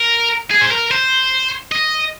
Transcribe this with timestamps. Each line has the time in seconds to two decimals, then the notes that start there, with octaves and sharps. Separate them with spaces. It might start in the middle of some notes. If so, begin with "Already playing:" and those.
Already playing: A#4
0.51 G#4
0.62 C5
0.72 A#4
0.91 C5
1.72 D#5